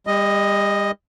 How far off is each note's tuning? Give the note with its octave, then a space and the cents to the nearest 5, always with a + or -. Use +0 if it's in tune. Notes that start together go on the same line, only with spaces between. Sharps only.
G3 +35 D#5 +0